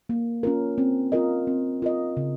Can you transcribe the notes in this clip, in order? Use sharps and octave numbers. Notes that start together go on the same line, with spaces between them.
A#3
C#4 F4 A#4
C4
F4 A#4 D#5
C4
F4 A#4 D#5
C#3